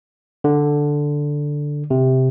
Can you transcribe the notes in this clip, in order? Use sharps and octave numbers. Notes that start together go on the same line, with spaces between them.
D3
C3